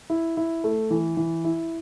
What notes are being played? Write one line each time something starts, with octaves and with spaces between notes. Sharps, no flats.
E4
E4
A3
E3
E3
E4